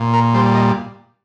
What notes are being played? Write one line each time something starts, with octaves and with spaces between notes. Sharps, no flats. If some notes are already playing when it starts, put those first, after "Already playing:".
Already playing: A#2
A#4
G3 C5
D#5